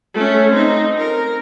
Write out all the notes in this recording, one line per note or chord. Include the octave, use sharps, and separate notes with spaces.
A3 C#4
C4 D#4
A#4